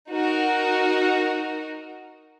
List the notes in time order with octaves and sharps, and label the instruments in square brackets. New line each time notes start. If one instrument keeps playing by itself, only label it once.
[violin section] D#4 F#4 A#4